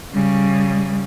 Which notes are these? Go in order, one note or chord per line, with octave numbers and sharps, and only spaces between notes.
C#3 G3